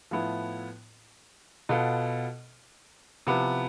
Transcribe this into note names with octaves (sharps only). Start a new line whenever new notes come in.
A2 F3 B3 E4
B2 B3 F4 A4
C3 F3 B3 E4